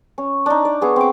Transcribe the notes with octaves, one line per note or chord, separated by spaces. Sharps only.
C#4
D4 D#4
D5
B3 G#4 C#5
C4 D6